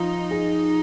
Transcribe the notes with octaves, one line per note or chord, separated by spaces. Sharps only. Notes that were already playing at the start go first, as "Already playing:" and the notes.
Already playing: F3 D#4 F4
G#4